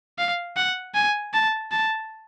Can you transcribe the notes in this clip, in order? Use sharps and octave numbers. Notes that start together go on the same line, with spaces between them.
F5
F#5
G#5
A5
A5